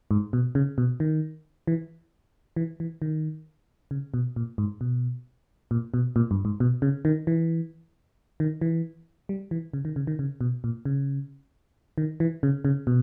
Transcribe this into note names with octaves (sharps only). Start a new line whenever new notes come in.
G#2
B2
C#3
B2
D#3
E3
E3
E3
D#3
C#3
B2
A#2
G#2
B2
A#2
B2
A#2
G2
G#2
B2
C#3
D#3
E3
D#3
E3
G3
E3
C#3
D#3
C#3
D#3
C#3
B2
A#2
C#3
D#3
E3
C#3
C#3
B2